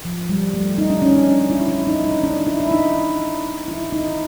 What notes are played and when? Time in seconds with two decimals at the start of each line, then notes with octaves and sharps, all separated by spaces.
0.05 F3
0.29 G3
0.54 A3
0.78 D#4
0.90 D4
1.02 C#4
1.14 D4
1.50 E4
1.68 E4
1.87 D#4
2.04 D#4
2.23 D4
2.47 E4
2.60 E4
2.71 D#4
3.68 E4
3.92 D#4